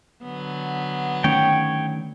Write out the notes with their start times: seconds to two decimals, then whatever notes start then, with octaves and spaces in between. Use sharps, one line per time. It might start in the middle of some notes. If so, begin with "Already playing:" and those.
0.23 D3 F#3 B3
1.24 D#3 A3 C#4 C#5 G5